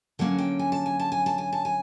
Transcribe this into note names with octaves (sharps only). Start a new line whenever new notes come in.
D3 F#3 A#3 C#4 F#5
G5
G#5
A5
G#5
A5
G#5
A5
G#5
A5
G#5